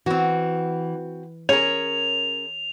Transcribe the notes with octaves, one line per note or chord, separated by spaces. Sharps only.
E3 C4 F#4
C#4 G#4 A#4 C#5 F7